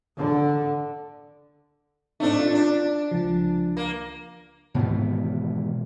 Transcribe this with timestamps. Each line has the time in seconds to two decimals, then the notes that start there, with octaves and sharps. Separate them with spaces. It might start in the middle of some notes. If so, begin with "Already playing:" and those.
0.19 D3
2.20 A2 A3 C4 D4 D#4
2.39 F4
2.54 D4
3.11 C#2 F3
3.77 A#3
4.74 G#2 B2 D#3 E3